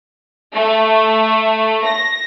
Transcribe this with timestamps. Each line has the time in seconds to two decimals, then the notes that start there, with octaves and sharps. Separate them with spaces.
0.54 A3
1.85 A#6